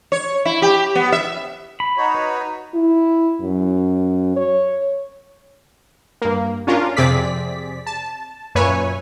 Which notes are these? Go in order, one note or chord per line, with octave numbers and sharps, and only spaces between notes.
C#5
E4
G4
B3
E5
B5
D#4 F#4 C#5
B4
E4
F#2
C#5
G2 A#3
C#4 D4 F4 A#4
F2 C3 C4 G#4 D5 B6
A5
F#2 A#2 B4 C#5 E5 G#5